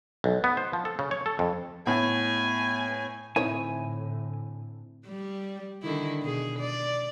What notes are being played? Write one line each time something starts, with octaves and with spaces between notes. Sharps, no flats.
B1
B3
C5
F3
A4
C#3
C#5
A4
F2
A2 B3 G#5
A2 D3 C4 D#4 E4 C5 C#5 G#5
G3
D3 D#3 E4
B2 G#4
D5